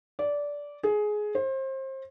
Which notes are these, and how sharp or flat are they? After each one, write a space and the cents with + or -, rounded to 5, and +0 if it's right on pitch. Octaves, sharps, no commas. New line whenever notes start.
D5 -15
G#4 +15
C5 +30